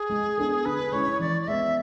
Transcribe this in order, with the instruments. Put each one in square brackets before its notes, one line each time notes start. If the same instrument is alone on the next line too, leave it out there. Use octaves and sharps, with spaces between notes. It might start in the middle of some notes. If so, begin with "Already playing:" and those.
Already playing: [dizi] G#4
[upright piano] G#3
B3 D4 A4
[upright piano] D3 [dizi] B4
[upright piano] G#3 C#4 E4 [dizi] C#5
[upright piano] E3 [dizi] D5
[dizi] D5
[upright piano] G#3 B3 [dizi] E5